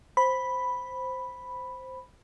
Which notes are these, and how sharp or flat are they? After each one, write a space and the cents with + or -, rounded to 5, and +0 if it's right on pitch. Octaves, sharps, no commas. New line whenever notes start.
C5 +0 B5 +0